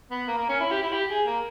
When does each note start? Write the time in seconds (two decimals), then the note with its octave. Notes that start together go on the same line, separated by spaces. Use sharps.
0.11 B3
0.27 A#3
0.37 A#3
0.49 C#4
0.60 E4
0.71 G4
0.83 E4
0.93 G4
1.10 G#4
1.26 A#3